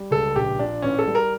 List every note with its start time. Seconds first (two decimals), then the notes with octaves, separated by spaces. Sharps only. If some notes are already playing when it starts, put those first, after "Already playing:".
Already playing: G3
0.11 C#2 A4
0.35 A#1 G4
0.59 A#2 D4
0.82 A1 C#4
0.99 A4
1.07 G3
1.15 A#4